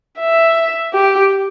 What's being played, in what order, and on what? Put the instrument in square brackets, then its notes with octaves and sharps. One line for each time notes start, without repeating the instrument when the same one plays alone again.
[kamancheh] E5
G4